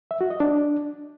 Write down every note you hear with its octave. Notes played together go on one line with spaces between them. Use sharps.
E5
F#4
D#5
D4